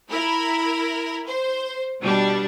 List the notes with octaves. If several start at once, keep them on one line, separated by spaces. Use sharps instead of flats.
E4 A#4 B5
C5
B2 G3 D4